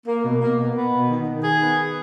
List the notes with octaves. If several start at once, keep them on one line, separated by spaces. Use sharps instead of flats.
A#3
B2
A#3
B2
B3
B2
D#3
D#3
G#4
B3